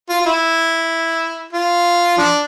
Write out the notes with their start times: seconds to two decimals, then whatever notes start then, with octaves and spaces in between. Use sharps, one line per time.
0.09 F4
0.21 F4
0.26 E4
1.53 F4
2.17 F3 D4